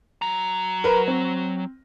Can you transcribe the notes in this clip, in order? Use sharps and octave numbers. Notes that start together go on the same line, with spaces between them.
F#3 A#5
A#4 B4
C4